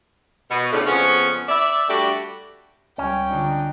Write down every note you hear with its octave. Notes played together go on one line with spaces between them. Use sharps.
B2
A2 C#3 A3 C#4 D4 F4
F2 C#3 B3 C#4
D5 E5
G3 A3 D4 F#4 G4
C#2 G3 C#4 G5
D3 D4 D#4 F4